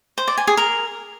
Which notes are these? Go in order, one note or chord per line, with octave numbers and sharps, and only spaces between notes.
C5
D5
G#5
G#4
A#4